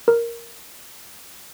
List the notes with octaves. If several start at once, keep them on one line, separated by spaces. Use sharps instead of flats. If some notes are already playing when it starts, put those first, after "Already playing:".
A#4